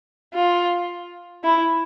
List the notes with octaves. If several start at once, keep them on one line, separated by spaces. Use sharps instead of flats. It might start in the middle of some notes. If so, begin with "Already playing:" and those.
F4
E4